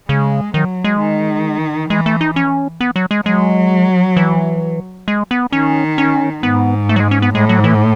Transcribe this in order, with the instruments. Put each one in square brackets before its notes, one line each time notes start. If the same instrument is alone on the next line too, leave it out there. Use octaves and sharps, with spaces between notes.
[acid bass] C#3 [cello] G#3
[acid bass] D#3 [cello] F#3
[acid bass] G#3
[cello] D#3
[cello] E3 [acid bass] G#3
[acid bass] A3
D#4
C#4
B3
F#3
G#3
[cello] F#3 [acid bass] G#3
[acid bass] E3
G#3
B3
[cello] D#3 [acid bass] C#4
[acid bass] C#4
[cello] G#2 [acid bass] B3
[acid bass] A3
F#3
G#3
C#4
B3
[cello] A2 [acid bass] G#3
[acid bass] F#3
E3